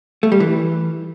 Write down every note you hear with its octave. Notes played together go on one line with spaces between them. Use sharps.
A3
G3
E3